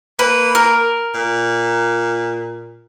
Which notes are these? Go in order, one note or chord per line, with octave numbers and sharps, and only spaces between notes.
A#3 B4
A#4
A#2